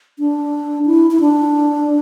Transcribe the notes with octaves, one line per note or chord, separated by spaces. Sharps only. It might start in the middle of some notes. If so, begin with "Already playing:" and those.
D4
E4
E4
D4